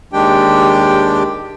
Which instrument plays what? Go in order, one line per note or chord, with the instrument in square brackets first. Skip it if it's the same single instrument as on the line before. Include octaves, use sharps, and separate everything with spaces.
[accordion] D#2 D#3 G#3 D4 G4 G5